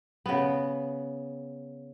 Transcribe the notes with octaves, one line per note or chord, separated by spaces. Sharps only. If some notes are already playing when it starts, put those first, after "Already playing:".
C#3 B3